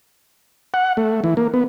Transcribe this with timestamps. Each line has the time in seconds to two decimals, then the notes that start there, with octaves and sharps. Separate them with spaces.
0.74 F#5
0.97 A3
1.24 E3
1.37 A#3
1.54 B3